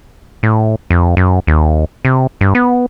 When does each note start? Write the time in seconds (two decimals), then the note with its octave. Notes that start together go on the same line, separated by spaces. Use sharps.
0.43 A2
0.90 F2
1.17 F#2
1.47 D#2
2.05 C3
2.41 G2
2.55 B3